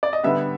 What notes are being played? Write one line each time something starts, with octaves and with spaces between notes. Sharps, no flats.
D5
D#5
D3 G3 B3 E5